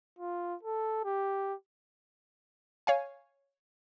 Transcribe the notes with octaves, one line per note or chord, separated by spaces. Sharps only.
F4
A4
G4
C#5 F5 G#5